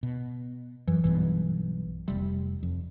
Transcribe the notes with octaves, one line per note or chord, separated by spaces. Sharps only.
B2
F#2 E3
B1 G2 B2 E3
F1 C3 G3
F2